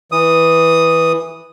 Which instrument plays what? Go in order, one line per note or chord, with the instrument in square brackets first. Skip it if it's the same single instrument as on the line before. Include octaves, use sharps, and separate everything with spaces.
[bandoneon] E3 D#6